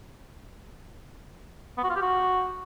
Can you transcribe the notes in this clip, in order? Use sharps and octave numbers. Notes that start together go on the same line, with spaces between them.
B3
F#4
F4
G4
F#4